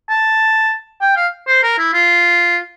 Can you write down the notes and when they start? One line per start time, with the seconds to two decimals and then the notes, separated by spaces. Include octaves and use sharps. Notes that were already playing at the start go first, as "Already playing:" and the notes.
0.09 A5
1.01 G5
1.16 F5
1.48 C5
1.63 A#4
1.78 E4
1.94 F4